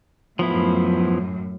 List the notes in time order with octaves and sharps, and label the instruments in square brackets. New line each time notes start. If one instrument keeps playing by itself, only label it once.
[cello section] F#2 A2 [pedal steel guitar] F3 B3 E4